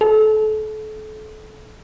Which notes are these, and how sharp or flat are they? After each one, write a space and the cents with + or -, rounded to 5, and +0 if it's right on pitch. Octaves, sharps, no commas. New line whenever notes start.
A4 -30